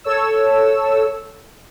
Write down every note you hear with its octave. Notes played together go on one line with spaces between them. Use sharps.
A4 C#5 E6